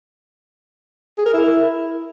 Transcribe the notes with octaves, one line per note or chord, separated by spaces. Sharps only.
G#4
A#4
E4